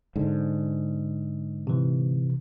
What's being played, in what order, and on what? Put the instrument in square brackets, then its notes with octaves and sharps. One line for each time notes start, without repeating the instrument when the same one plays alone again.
[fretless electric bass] G#2 D3
[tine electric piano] C3 E3